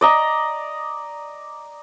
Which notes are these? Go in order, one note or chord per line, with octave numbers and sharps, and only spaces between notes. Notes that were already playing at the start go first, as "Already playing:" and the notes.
D5 D#5 A#5